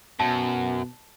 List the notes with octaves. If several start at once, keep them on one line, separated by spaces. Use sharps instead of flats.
F#2 B2 A5